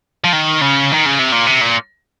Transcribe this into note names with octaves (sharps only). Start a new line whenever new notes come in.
F3
D#3
C#3
D#3
C#3
C3
A#2
C3
A#2